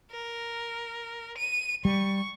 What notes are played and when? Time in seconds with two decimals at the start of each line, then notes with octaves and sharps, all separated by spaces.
0.11 A#4
1.38 D#7
1.85 G3 C#6